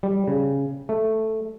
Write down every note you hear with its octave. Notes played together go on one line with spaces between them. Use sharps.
G3
C#3
A3